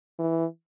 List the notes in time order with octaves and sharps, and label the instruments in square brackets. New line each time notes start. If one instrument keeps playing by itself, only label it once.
[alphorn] E3